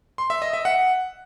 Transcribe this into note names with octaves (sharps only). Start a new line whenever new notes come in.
C6
E5
D#5
E5
F#5